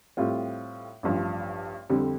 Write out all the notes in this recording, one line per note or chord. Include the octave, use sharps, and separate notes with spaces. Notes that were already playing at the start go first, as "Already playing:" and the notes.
A2 G3 C4 F4
A1 G2 F3
F2 D3 G3 C4